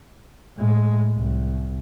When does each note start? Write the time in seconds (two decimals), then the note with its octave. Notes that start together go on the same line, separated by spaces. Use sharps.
0.57 A2 G#3
1.16 C2